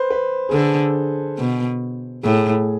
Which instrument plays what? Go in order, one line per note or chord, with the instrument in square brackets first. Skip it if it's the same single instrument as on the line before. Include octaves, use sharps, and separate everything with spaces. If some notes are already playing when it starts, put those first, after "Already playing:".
Already playing: [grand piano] B4 C5
B4
G#4
[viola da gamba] D3 [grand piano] A4
[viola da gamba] B2
[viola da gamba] A2 [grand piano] G#4